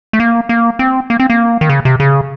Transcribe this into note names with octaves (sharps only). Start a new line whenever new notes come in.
A3
A#3
A#3
C4
A#3
C4
A#3
D#3
C#3
C3
C#3